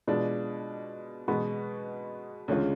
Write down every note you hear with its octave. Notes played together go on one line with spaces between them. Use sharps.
B2 G#3 D4 F4
B2 G#3 B3 F#4
D2 C#3 G#3 C#4 F4